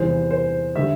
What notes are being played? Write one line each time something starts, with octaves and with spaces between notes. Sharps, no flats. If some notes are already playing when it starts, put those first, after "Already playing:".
Already playing: E2 C3 E3 G3 C5
C5
D3 G3 E5